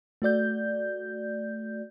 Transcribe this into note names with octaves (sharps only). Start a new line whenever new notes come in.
A3 F#4 D5 G6